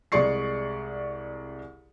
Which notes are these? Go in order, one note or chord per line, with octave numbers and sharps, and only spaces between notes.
C2 G#3 G#4 D5 C#6 C7